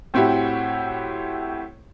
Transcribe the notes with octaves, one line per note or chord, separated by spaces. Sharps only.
A2 C4 E4 F#4 G4